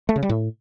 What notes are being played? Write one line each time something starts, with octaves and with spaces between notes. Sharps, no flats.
A3
C#3
G3
A2